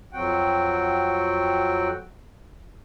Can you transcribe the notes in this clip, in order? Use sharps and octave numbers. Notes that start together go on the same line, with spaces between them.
F2 F#3 C4 F#4 F#5 G5